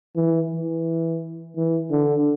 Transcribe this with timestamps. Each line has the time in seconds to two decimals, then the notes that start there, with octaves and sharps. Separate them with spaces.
0.16 E3
0.51 E3
1.56 E3
1.91 D3